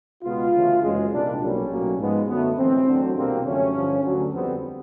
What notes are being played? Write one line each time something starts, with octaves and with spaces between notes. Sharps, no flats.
C#2 B2 G#3 B3 F4
D2 C#3 E3 A3
F#1 F#2 C#3 E3 G#3
C2 A#2 G3 D4
B1 A#2 G3 A#3 C#4
B1 A2 F#3 A#3
G#2 F3 G#3 B3
F#2 D3 F#3 A3 B3
A1 A2 E3 G#3 C4
D2 D3 F#3
C2 B2 G3 A#3 C4
F#2 D3 F3 A3 C#4
G2 D3 F3
D2 D3 F#3
F2 D3 G3 B3 C4